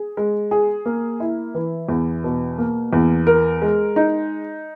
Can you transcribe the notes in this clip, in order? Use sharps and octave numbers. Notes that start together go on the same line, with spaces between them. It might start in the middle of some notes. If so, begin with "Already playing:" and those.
Already playing: G#4
G#3
G#4
A#3
E4
E3
E2
B2
A#3
E2
A#4
G#3
D#4